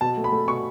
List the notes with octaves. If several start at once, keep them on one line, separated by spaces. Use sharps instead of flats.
B2 A5
A3
B5
A3
B2 C#6